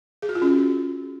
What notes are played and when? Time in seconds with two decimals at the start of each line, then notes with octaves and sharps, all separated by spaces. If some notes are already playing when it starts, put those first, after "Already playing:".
0.22 G#4
0.29 F#4
0.35 F4
0.42 C#4